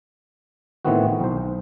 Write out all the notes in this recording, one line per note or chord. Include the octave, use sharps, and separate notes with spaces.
A2 D#3 E3 B3 C4 F#4
B1 C5